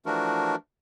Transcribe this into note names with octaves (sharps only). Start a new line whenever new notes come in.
E3 F3 A3 D4 F#4 A#4